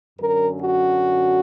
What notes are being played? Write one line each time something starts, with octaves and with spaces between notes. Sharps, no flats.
F#2 D3 F#3 C#4 A#4
F#4